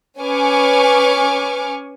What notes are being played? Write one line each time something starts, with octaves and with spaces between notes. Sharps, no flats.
C#4 B4 G#5 C#6 D6 F6